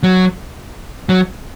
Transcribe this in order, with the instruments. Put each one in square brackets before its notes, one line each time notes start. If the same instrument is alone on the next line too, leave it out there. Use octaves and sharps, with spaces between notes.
[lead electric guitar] F#3
F#3